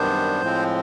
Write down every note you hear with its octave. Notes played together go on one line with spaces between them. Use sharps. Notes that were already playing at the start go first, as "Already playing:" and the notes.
Already playing: F#2 D#3 G3 B3 D4 C5
A2 F3 G#3 C4